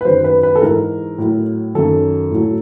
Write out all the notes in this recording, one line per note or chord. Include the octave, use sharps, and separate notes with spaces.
B4
F#2 D#3 F#3 C5
B4
B4
A4
G#2 E3 A#4
A2 F#3
F#2 D#3 F#3 A4
A2 F#3